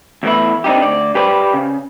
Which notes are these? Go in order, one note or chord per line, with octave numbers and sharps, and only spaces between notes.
E2 A2 E3 E4
C4 D4 D#4 G4
D2 D5
G4 B4 C5 D5
C#3